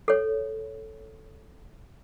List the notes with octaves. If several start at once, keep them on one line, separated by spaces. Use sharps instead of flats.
A4 C#5